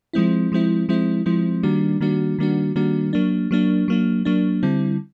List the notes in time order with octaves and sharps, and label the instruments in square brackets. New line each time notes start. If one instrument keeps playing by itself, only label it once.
[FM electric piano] F3 G#3 C4 E4
F3 G#3 C4 E4
F3 G#3 C4 E4
F3 G#3 C4 E4
D#3 G3 A#3 D4 F#4
D#3 G3 A#3 D4 F#4
D#3 G3 A#3 D4 F#4
D#3 G3 A#3 D4 F#4
F#3 A#3 D4
F#3 A#3 D4
F#3 A#3 D4
F#3 A#3 D4
D3 G3 C4 E4